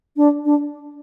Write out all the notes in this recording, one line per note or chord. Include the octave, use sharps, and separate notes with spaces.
D4
D4